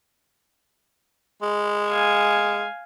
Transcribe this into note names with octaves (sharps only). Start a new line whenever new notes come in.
G#3
F5 G#5